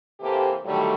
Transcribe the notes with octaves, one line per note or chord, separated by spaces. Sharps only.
C3 E3 A#3 G4 A4 C5
A2 D3 D#3 F#3 G3 A3